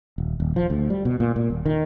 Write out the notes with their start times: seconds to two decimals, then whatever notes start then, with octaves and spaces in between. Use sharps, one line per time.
0.18 D#1
0.40 D#1
0.56 F3
0.70 D2
0.90 G3
1.05 B2
1.20 A#2
1.36 A#2
1.50 D#1
1.66 D#3